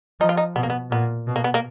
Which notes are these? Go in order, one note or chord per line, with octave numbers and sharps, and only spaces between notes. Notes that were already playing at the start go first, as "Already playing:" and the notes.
F3 D#4
F4
D#4
B2 B3
A#3
B3
A#2 B3
B2
A#3
B3
A#3